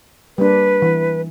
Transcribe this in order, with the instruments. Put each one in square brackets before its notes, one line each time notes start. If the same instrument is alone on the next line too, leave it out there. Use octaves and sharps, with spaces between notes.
[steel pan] G3 A#3 D4 [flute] B4
[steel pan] E3